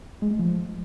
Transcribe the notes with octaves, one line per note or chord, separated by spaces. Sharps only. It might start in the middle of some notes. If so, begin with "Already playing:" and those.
G#3
A3
F3